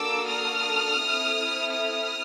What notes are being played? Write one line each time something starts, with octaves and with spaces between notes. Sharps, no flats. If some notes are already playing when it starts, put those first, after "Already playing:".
Already playing: A#3 D4 F#4 A4 D6 E6
D#6 F6
C4 E4 A4
D#6 F6